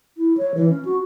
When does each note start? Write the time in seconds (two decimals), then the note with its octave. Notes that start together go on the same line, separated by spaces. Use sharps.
0.17 E4
0.37 C#5
0.54 E3
0.70 C#4
0.85 F#4